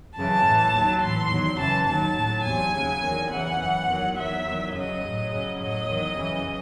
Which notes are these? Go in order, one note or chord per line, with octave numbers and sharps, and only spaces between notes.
F#2 C#3 E3 A5
A2 E3
D#2 D#3 F#3
A2 E3 C6
E2 D#3 F#3
F#2 C#3 E3 A5
D#2 D#3 F#3 A5
A2 F#3
E2 C3 F#3 G#5
D#2 C#3 F#3
E2 D#3 F#3
E2 C#3 E3 F#5
F#2 E3
E2 D#3 F#3
E2 D#3 F#3 E5
E2 D#3 F#3
F#2 C#3 F#3 D#5
A2 F#3
F#2 C#3 F#3
A2 F#3 D#5
E2 D#3 F#3
F#2 C#3 E3